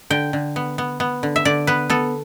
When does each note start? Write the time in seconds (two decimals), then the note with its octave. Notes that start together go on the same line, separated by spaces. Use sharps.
0.10 D3 G5
0.33 D3
0.56 B3
0.78 B3
1.00 B3
1.23 D3
1.36 E5
1.45 D3 D5
1.67 B3 B4
1.90 B3 A4